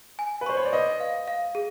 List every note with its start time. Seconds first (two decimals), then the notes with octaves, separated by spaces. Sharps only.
0.19 G#5
0.41 B4
0.46 C5 C#6
0.57 C#5
0.66 D5
0.73 B4 D#5
1.00 F5
1.28 F5
1.55 G#4